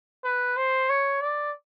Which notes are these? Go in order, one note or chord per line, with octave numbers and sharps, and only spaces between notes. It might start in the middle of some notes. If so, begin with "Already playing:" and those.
B4
C5
C#5
D5